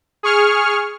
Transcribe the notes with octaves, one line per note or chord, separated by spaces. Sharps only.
G#4 C#6 F6